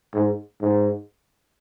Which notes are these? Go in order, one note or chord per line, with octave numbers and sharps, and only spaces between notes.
G#2
G#2